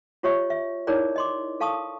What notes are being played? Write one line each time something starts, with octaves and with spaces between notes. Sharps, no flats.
F4 G4 C#5 D#5 E5 C#6
E5
D#4 E4 G#4 A#4 C#5 D5
D#5 C6 D6
A4 F5 A5 C#6 D#6 E6